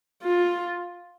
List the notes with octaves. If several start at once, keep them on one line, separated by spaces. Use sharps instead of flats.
F4